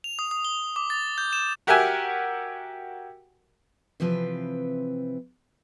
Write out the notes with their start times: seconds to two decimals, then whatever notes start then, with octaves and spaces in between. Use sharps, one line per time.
0.04 F7
0.19 D#6
0.31 D#6
0.45 G7
0.76 D6
0.90 A6
1.18 G6
1.33 E7
1.67 F#4 G4 A#4 E5 F#5 G#5
4.00 C3 E3 F3 C4 B4